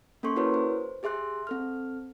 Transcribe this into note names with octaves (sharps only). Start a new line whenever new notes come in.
A#3 C#4 A4 C6 C#6
E4 F#4 A#4 B4 C#5
C5
G4 G#4 E5 C6 F#6
C4 A4 F6